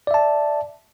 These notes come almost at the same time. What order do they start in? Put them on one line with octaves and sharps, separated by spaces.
D5 E5 A5